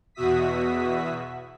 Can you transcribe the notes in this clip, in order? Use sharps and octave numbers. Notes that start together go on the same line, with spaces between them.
E2 B2 F#4 E5 D#6 B6